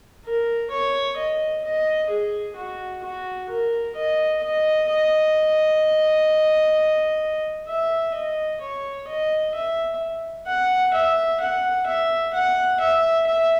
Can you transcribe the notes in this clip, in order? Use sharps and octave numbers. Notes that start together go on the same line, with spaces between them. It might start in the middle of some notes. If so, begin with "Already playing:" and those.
A#4
C#5
D#5
D#5
G#4
F#4
F#4
A#4
D#5
D#5
D#5
E5
D#5
C#5
D#5
E5
F#5
E5
F#5
E5
F#5
E5
E5